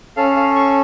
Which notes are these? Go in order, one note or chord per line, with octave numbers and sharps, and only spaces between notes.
C#4 A4 F5
F5
C#6